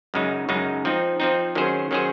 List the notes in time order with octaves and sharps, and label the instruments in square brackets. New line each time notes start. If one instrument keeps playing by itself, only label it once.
[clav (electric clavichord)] F#2 C#3 G#3 D#4
F#2 C#3 G#3 D#4
F3 C4 D#4
F3 C4 D#4
D#3 F#3 C#4 G#4 C5
D#3 F#3 C#4 G#4 C5